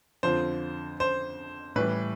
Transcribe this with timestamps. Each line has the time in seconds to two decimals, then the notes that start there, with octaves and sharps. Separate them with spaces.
0.23 F2 D3 F3 C5
1.00 C5
1.76 A2 E3 G3 B4